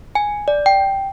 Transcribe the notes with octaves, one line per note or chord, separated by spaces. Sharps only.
G#5
D5
G5